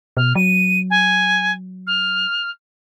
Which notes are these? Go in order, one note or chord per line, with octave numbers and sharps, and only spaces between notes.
B2 F6
F#3 D#7
G#5
F6